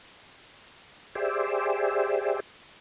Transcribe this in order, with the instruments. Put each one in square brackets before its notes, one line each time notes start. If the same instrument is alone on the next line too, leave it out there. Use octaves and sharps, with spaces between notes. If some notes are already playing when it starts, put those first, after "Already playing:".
[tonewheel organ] G4 G#4 C5 D5 E5